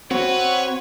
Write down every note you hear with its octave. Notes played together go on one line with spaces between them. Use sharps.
C4 F#4 B4 C#5